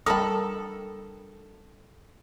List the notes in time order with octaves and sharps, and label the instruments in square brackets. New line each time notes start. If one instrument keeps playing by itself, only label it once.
[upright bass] G3 D4 [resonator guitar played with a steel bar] A4 [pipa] A#4 A5 B5 [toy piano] G5 D#6